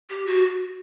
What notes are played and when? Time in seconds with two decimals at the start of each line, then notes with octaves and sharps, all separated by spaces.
0.10 G4
0.26 F#4